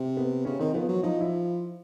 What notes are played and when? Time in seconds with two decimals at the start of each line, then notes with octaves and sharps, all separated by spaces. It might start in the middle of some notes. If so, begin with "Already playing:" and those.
Already playing: C3
0.17 B3
0.45 C#3 C#4
0.59 D#3 C4
0.74 F3 B3
0.89 F#3
1.03 F3 D#4
1.20 E4